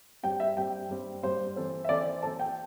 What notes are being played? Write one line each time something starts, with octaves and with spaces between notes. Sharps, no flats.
G2 G3 C4 G4 G5
E5
G2 G3 C4 G4 G5
G2 G3 C4 G4
G2 G3 C4 G4 C5
E3 C4 A4 C5
E5
E3 C4 A4 C5 D5
E3 C4 A4 C5 A5
G5